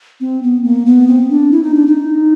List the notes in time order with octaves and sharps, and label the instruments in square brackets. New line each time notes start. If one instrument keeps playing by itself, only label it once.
[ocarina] C4
B3
A#3
B3
C4
D4
E4
D#4
D4
D#4